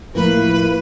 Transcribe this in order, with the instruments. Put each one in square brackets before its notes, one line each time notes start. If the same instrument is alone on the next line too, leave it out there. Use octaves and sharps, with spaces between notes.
[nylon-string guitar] A2 F3 A#4 [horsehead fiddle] A#3 [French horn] E4 [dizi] B4